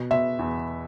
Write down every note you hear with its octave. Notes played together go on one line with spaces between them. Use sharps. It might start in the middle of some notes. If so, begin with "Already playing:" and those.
Already playing: B2
B2 E5
E2